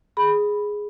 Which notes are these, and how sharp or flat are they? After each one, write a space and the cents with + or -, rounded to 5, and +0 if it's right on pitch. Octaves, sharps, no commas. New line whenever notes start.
G#4 +0 B5 +0